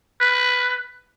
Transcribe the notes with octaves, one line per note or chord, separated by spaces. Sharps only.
B4